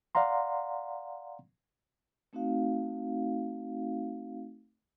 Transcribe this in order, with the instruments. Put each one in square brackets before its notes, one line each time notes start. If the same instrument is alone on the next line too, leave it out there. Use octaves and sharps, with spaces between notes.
[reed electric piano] D5 F5 F#5 A#5 C6
[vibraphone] A3 C4 D#4 F#4 F5